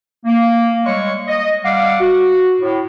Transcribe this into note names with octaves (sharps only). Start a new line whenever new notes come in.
A#3
G3 G#3 C#5 C#6
D#5
G3 F5 F#5 D6
F#4
A2